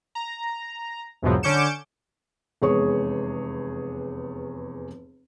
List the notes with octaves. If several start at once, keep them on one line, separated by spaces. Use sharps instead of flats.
A#5
A#1 E2 G#2 B2 F3 F#3
D3 C#4 D6 G6 C#7 E7
F1 E2 G#3 G#4 C#5 C#6